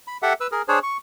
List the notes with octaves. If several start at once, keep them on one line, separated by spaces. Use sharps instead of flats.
B5
G4 A4 E5 F#5
B4 E6
G#4 A#4
D4 G#4 C5 C#5
C#6